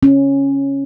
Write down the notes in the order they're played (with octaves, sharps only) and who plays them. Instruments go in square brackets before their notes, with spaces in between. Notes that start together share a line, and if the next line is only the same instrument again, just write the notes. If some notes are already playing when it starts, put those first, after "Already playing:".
[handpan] C#4